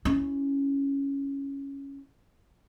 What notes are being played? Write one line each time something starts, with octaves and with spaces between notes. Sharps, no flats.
C#4 E4